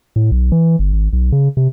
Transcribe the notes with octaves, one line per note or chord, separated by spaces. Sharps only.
A2
B1
E3
G1
G#1
B1
C#3
C3